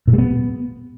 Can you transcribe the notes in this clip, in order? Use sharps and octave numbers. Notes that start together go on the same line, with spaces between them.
A#2
G3
B3